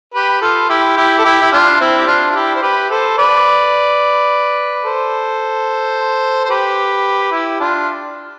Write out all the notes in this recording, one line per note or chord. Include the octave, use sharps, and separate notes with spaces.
G4 B4
F4 A4
E4 G4
E4 G4
A4
E4 G4
E4
D4 F4
C4 E4
G4
D4 F4
F4
E4 G4
C5
G4 B4
A4 C5
B4 D5
A4 C5
C5
G4 B4
E4 G4
D4 F4